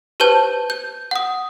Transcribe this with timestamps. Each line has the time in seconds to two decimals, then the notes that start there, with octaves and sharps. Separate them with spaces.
0.20 G4 B4 C5 A5 G6
0.70 G6
1.11 F#5 D#6